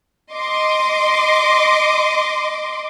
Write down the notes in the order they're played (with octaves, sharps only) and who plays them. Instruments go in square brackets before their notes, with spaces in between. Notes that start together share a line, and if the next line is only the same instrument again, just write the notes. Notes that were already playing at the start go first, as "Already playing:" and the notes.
[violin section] D#5 C6 D6